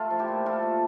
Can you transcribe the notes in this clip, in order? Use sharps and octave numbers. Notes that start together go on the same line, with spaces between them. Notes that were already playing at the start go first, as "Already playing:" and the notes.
Already playing: A3 F4 A4
F3
E4 G4
A#2
A#2 F4 A4
A3